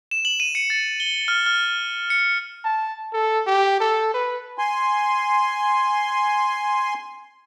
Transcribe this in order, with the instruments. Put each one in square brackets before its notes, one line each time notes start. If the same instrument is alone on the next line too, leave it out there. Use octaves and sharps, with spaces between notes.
[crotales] E7
F#7
D#7
C#7
A6
G7
F6
F6
C#7
[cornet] A5
A4
G4
A4
B4
[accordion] G#5 C6